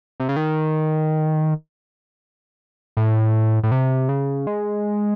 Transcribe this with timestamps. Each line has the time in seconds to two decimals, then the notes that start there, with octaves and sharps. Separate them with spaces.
0.20 C3
0.29 C#3
0.36 D#3
2.97 A2
3.63 A2
3.72 C3
4.09 C#3
4.47 G#3